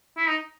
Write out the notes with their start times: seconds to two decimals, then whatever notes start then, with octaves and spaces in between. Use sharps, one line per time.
0.17 E4
0.27 D#4